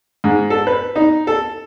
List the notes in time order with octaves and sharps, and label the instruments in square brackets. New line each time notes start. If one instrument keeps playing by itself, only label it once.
[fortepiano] G#2
A4
B4
D#4
A4